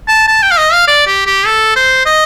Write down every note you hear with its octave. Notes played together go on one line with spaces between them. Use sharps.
A5
A5
G5
F5
D#5
F5
D5
G4
G4
A4
C5
D#5